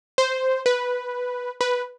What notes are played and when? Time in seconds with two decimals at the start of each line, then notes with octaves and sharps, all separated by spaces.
0.18 C5
0.66 B4
1.61 B4